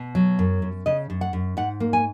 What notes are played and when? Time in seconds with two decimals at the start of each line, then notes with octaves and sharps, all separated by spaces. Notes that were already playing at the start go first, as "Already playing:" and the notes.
Already playing: B2
0.15 F#3
0.39 F#2
0.62 F#2
0.86 C#3 D#5
1.10 F#2
1.21 F#5
1.33 F#2
1.57 G#2 F#5
1.80 A#3
1.93 G#5